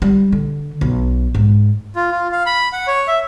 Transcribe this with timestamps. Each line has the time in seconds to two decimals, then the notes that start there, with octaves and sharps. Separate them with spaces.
0.02 G3
0.32 D3
0.81 B1
1.35 G#2
1.96 F4
2.12 F4
2.32 F5
2.46 B5
2.73 F#5
2.87 C#5
3.08 E5